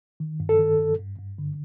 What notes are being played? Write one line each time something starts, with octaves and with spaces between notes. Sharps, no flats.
D#3
G2
A4
D#3
G2
G2
G2
D3